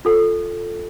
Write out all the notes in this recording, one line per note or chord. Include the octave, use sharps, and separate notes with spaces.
F4 A4